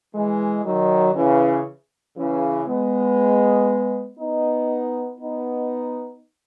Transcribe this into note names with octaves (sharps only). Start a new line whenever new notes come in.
E3 G#3
D#3 F#3
C#3 E3
C#3 E3
G#3 B3
B3 D#4
B3 D#4